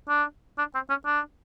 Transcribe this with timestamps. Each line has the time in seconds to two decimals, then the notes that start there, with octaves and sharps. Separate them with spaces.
0.09 D4
0.58 D4
0.75 C4
0.90 C#4
1.06 D4